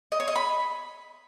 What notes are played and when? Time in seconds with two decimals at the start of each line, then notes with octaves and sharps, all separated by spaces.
0.12 D#5
0.20 C#5
0.28 D#5
0.36 B5